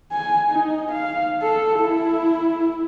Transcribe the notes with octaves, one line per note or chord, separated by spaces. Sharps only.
G#5
D#4
F5
A4
E4